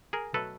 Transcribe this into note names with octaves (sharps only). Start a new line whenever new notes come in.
G#4 A#4
B2 F#3 A3 A4 B4